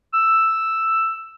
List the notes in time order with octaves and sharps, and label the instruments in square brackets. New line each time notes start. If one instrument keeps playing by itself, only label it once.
[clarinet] E6